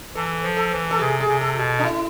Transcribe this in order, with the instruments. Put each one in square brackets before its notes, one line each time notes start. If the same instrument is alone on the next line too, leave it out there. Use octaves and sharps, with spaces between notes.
[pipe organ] E3 [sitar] A4
[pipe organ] F3
[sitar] A4
[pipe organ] E3
[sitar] A4
[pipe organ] C3 [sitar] G#4
[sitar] G#4
[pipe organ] C3
[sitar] A4
[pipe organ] B2
[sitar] D4
E4